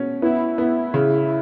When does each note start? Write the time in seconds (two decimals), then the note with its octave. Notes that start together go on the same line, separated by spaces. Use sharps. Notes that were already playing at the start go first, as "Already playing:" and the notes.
Already playing: B2 C#4
0.22 B3 E4
0.58 B3
0.94 C#3